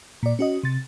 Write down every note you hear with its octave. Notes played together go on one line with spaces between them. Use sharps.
A#2 D5
C#4 F#4 D#5
C3 A6